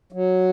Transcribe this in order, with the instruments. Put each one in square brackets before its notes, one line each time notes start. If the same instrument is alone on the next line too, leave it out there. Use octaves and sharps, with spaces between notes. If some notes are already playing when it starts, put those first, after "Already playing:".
[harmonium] F#3